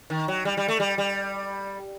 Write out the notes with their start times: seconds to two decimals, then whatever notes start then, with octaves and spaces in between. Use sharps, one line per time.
0.10 D#3
0.28 F#3
0.45 G3
0.57 G3
0.68 A3
0.80 G3
0.98 G3